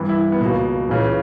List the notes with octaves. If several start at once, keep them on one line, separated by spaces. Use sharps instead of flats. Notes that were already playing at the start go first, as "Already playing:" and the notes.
Already playing: G2 E3
E4
B3
C#2 B2 A#3
C#2 C#3 E3